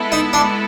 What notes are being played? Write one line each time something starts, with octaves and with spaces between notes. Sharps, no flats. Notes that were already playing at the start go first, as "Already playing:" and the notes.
Already playing: G#3 B3 E4 A4
D#4
D4